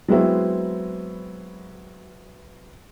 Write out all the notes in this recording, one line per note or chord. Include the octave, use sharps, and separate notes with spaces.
F#3 G#3 B3 C4 E4 F#4